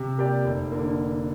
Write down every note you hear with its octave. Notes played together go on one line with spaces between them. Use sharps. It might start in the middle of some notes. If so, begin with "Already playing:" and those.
Already playing: C3
A#3 G4 D5
F1
D3 A#3